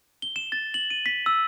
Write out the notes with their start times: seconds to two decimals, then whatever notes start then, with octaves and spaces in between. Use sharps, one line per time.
0.22 G7
0.36 E7
0.52 A6
0.74 F#7
0.90 D#7
1.06 B6
1.26 E6